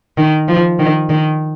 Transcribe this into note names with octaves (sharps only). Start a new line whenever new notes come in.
D#3
F3
D#3
D#3